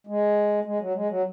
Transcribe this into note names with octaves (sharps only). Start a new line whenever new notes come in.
G#3
G#3
F#3
G#3
F#3